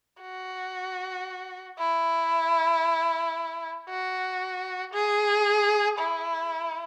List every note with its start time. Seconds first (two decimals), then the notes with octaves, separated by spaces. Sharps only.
0.21 F#4
1.79 E4
3.89 F#4
4.94 G#4
5.99 E4